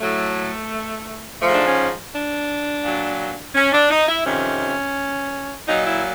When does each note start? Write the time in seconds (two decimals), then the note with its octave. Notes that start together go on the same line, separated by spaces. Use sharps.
0.01 A2 F#3 A3
1.42 G#2 F3 A3
1.54 D4
1.66 C#4
2.14 D4
2.84 A#2 F#3
3.55 C#4
3.73 D4
3.91 D#4
4.08 E4
4.25 F2 C3 D#3 C#4
5.68 A#2 F#3 D#4
5.86 E4